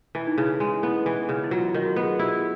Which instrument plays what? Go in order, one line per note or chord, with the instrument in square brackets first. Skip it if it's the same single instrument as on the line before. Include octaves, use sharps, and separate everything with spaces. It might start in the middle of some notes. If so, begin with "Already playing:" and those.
[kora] E3 [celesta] E4
[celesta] D#4
[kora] C#3 [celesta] E4
[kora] G#3
[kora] B3 [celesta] E4
[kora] E3
C#3
[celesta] E4
[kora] F#3 [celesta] F4
[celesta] F#4
F4
[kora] D#3
[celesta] F#4
[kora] B3
[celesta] G#4
[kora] E4 [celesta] G4